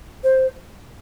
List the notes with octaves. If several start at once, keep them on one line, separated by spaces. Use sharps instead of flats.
C5